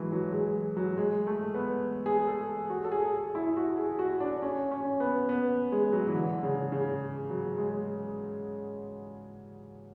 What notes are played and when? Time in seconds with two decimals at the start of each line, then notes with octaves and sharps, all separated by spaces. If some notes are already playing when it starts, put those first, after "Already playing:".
Already playing: E3 F#3 G#3 A3
0.12 F#3
0.32 G#3
0.77 F#3
0.97 G#3
1.27 A3
1.54 B3
2.06 G#4
2.27 A4
2.70 F#4
2.85 A4
2.92 G#4
3.13 G#4
3.35 E4
3.57 F#4
3.77 G#4
3.99 F#4
4.20 D4
4.42 C#4
4.71 C#4
5.00 B3
5.29 B3
5.72 G#3
5.93 F#3
6.07 E3
6.15 D3
6.43 C#3
6.72 C#3
7.30 F#3
7.58 G#3